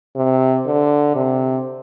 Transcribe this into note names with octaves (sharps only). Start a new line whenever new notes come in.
C3
D3
C3